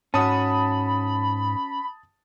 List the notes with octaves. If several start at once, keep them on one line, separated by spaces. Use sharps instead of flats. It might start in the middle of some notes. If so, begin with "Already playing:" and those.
G#2 C#4 F#4 A5 B5 D#6